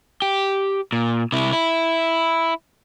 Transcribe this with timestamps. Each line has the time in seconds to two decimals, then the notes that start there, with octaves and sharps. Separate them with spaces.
0.22 G4
0.92 A#2
1.32 C3 E4
1.53 E4